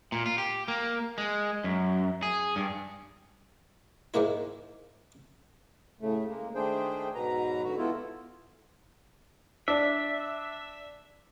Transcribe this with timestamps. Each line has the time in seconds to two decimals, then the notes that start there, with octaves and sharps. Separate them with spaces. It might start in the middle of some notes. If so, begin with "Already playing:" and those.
0.12 A#2
0.26 F4
0.38 G4
0.68 A#3
1.18 G#3
1.64 F#2
2.23 G#4
2.56 G2
4.14 G#2 D#3 G#3 A#3 E4
6.01 A2 C#3 A3
6.28 G#3 A#3
6.55 D#3 A3 D4 G#4 C5 G5
7.15 G#2 B2 F#3 B4 A#5
7.64 G#2 D3 F#4
7.78 B3 E4 F4 A4
9.68 D4 E5